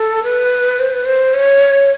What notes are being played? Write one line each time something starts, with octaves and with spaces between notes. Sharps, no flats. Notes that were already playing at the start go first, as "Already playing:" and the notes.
Already playing: A4
B4
C5
B4
C5
C#5